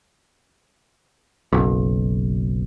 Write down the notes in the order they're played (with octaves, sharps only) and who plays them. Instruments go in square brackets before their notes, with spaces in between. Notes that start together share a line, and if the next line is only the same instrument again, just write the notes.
[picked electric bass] F#1 B1